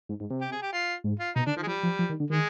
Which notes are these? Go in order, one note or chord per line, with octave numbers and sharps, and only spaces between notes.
G#2
G#2
C3
G4
G#4
G4
F4
G#2
F4
B2 D#4
D3 D4
D#3 F3
G#3
F3 G3
F3
F3
D#3
D3
D#3 G#3